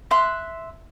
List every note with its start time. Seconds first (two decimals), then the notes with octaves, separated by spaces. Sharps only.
0.11 E5 C6 F#6